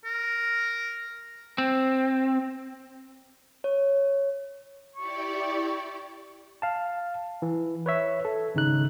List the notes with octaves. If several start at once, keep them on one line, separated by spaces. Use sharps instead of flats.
A#4
C4
C#5
E4 G4 D5 C#6
F5 A5
E3
B4 C#5 E5
A4
G#1 C#3 D#4 F#6